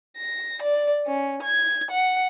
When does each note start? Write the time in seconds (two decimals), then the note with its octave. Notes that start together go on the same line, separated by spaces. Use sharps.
0.18 A#6
0.62 D5
1.06 C#4
1.43 G#6
1.91 F#5